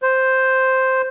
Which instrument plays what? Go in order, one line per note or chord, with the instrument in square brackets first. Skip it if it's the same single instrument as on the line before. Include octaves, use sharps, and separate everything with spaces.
[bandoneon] C5